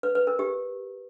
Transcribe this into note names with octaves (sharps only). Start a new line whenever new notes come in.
B4
B4
A#4
G4